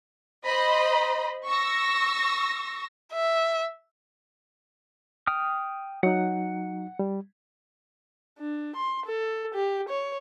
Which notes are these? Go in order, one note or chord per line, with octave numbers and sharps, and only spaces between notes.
C5 D#5 B5
C#6 E6 A#6
E5
G5 D#6 F6
F#3 D#4 F#5
G3
D4
C6
A4
G4
C#5